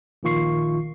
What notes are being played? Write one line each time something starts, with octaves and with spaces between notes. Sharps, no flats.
A#1 A#2 D#3 F4 C#6 C7